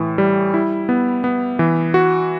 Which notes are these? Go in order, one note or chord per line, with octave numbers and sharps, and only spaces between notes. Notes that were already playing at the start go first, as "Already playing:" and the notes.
Already playing: A2 E3
G3
E4
B3
B3
E3
F#4